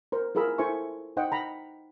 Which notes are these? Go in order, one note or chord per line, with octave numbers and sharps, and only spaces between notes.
A#4 C5
E4 F4 G#4 A#4 B5 E6
E4 A4 C5 E5 G#5 C#6
D#4 C5 D#5 F#5 G5
A#5 B5